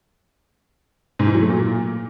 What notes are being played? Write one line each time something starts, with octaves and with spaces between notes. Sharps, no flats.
G#2
E3
F#3
A3
A#2